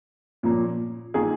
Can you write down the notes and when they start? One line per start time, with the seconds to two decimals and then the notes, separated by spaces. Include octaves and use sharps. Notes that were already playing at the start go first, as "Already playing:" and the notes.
0.43 A#2 F3 A#3 C#4
1.14 D#3 A#3 F4 G#4